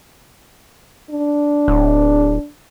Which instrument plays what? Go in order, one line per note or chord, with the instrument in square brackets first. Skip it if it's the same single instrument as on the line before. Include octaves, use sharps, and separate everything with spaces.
[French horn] D4
[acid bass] D1